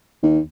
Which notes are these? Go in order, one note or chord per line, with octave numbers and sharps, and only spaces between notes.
D#2